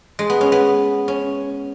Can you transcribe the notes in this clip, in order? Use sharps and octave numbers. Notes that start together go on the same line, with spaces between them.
G#3
B3
C#4
B3
C#4